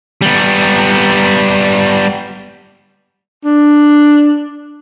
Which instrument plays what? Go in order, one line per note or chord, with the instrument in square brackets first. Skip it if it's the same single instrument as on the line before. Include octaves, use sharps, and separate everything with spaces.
[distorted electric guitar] G3 B3
[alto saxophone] D4